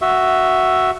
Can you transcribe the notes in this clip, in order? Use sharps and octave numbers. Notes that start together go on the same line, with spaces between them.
F#4 E5